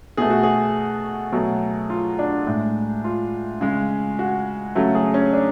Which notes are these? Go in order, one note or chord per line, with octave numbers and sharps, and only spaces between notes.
B2 A3 G#4
F#4
G#4
B2 F#3 A3
F4
D4
A2 G#3
F4
C#3 G#3
F#4
C#3 F#3 A3
G#4
C#4
D4